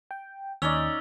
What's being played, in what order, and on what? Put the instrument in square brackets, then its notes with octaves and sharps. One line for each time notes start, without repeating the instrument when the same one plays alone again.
[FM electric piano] G5
[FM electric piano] D#2 [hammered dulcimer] C#4 D#4 D5 [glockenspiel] E6 F7 G7